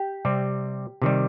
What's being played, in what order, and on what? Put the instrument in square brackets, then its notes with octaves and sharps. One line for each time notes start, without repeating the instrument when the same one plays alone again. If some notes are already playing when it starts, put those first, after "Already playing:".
Already playing: [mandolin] G4
[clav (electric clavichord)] C3 G3 C4
C3 D#3 G3